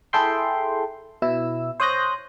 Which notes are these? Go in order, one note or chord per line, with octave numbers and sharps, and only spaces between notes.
E4 G#4 A4 E5 G5 C6
B2 E4 E6
C5 C#5 D#6 F#6 G6 A#6